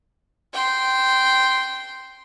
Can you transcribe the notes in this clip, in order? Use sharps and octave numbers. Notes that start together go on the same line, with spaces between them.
G5 C6